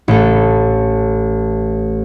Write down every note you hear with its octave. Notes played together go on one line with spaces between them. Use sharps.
A1 A4